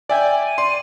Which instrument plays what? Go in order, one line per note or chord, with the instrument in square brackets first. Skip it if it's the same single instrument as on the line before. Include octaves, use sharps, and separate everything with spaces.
[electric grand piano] D5 E5 G5 [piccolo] G#5
[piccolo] D#7
[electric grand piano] D5 C6